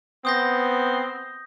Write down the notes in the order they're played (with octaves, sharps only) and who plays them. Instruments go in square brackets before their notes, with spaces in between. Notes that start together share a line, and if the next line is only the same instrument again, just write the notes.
[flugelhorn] B3 [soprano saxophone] C4 [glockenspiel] D#6 G6 A#6